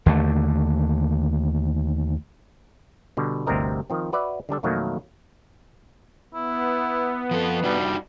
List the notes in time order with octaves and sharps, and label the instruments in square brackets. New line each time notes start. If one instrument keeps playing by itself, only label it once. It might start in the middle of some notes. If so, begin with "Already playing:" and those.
[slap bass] D#2 D3 A3
[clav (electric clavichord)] B2 D3 G3
G1 D2 C3 C4 A#4 D#5
D#3 F3 C4
F#4 B4 D5 E5
D3 G3 D4 A4
F2 B2 D#3 F#3 A3 A#3
[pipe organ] B3 [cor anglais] E4
[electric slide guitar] F3 A4
[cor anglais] G3 [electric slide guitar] D4 D#4 F#4